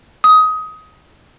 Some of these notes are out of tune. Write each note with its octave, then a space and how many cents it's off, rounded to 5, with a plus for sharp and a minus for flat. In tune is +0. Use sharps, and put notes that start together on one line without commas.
D#6 +20